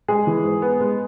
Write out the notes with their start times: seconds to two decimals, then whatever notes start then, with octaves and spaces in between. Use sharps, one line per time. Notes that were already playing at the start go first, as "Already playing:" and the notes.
0.08 G#3 G#4
0.27 E3
0.44 G#2
0.62 B3
0.80 G#3